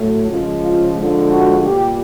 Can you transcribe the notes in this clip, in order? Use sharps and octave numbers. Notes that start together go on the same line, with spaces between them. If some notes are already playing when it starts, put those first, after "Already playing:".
Already playing: A2 F#3 A3
C#3 F3 G#3 F4
F4
D3 F3 G#3
F#4
A#2 G3 G4